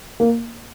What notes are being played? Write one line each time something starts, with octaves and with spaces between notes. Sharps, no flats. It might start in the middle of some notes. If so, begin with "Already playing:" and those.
A#3